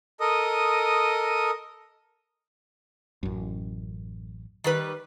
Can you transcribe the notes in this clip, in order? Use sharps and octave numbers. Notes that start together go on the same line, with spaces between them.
A4 A#4 D#5 D#6
A1 F#2
D#3 G3 B4